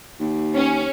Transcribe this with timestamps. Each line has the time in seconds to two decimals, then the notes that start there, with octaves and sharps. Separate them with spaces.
0.20 D#2
0.55 C#4